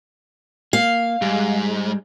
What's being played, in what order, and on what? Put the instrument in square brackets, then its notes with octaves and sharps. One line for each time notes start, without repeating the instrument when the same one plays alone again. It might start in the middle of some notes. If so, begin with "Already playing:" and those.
[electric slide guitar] A#3 [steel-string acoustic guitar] F5
[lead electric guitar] G#2 [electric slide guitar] G3 G#3